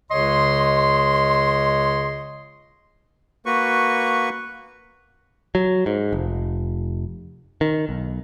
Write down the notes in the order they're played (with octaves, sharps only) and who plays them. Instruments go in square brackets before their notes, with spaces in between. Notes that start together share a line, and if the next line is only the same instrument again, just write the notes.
[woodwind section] C#2 C#3 C#5 D#5 C6
[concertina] A#3 F#4 B4 C#6
[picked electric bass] F#3
G#2
F1
D#3
B1